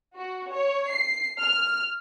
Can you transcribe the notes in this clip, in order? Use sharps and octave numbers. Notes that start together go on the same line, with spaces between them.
F#4
C#5
C7
F6